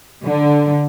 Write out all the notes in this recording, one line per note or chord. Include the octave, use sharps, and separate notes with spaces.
D3